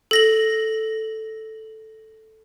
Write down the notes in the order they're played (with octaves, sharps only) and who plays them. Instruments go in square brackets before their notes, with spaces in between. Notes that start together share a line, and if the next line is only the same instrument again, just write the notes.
[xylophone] A4 A#6 F#7